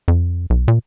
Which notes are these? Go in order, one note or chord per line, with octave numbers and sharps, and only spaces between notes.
F2
B1
A#2